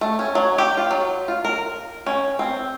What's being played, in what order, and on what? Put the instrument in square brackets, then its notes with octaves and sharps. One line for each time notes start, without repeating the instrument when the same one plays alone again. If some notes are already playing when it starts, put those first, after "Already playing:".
[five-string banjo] A3
C#4
F#3
G4
F4
F#3
F4
A#4
C#4
C4